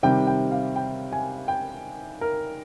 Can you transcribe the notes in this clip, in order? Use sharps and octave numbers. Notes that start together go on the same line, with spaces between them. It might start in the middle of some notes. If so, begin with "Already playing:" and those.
C3 D#3 G3 G5
G5
F5
G5
G#5
G5
A#4